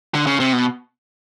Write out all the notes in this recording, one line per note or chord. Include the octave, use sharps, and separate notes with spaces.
D3
C#3
C3
B2